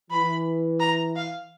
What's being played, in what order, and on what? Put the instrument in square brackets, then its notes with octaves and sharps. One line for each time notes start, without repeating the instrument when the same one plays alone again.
[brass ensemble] E3 [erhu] B5
[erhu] A#5
F5